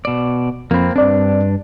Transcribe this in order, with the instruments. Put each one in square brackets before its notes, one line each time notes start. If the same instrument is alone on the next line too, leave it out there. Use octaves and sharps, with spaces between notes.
[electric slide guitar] B2 D5
[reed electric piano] F2 B5 [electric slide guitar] A#3 C4
[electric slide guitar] G2 D4 [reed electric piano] C4 D5